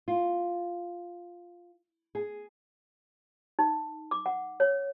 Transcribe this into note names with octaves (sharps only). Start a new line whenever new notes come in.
F4
G#4
D#4
D6
F#5
C#5